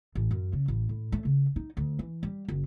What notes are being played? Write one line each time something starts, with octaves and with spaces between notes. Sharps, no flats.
A1
F#2
C#3
A1
A2
A3
C#3
D#4
D2
E3
G3
F#1